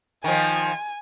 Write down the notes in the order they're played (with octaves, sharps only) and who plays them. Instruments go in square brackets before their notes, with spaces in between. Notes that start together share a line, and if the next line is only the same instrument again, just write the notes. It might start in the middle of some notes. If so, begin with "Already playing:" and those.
[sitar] D#3 F3 [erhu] G#5